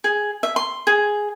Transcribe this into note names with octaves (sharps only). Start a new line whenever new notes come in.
G#4
E5
C6
G#4